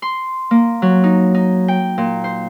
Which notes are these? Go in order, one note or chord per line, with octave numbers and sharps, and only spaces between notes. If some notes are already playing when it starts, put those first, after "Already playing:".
C6
A#3
F#3
D#4
D#4
G5
A#2
C5